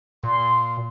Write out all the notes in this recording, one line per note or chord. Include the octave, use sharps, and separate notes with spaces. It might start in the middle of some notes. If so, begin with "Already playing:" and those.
A#2 C6